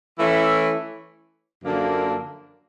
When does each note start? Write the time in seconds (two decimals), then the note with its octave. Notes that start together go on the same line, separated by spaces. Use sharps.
0.19 E3 A3 C#4 E4
1.62 F#2 D3 F3 A#3 D4